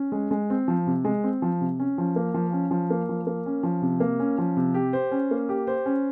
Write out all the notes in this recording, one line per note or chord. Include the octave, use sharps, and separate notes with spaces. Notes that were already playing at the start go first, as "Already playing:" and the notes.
Already playing: C#4
G#3
G#3
C4
F3
C3
G#3
C4
F3
C3
C#4
F3
A#3
F3
C#4
F3
A#3
F3
A#3
C#4
F3
C3
A#3
C#4
F3
C3
G4
C5
C#4
A#3
G4
C5
C#4